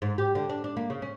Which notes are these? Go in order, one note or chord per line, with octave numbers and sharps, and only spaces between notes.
G#2
G4
D3
D4
D4
A#3
C#3
C#4